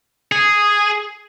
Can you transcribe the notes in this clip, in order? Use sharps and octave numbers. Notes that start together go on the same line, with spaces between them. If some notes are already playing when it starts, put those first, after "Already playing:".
G#4